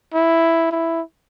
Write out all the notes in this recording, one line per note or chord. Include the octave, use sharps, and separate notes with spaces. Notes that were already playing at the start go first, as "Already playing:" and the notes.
E4
E4